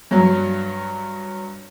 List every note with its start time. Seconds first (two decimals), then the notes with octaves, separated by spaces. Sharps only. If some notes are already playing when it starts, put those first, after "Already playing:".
0.11 G2 F#3